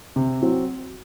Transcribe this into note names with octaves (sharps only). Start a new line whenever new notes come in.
C3
F#3 C4 F#4